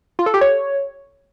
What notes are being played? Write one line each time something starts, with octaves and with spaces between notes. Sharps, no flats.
F4
A4
G4
C#5